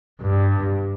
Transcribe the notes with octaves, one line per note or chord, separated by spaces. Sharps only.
G2